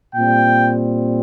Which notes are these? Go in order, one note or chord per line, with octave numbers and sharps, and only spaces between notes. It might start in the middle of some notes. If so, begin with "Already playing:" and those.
A#2 G3 C4 G5